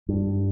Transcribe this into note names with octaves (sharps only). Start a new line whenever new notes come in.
G2